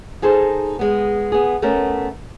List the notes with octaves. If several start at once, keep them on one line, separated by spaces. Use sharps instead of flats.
D#4 G#4 A4 C5
G#3 B3
B3 G#4
A3 B3 C#4 A#4